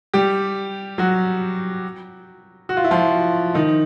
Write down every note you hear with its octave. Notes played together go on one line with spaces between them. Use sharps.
G3 G4
F#3 F#4
F#4
F4
E4
F3 F4
D#3 D#4